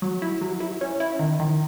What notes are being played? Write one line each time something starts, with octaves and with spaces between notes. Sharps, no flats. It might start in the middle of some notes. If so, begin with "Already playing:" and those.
F#3
E4
F#3
E4
C#4
E4
D#3
D#3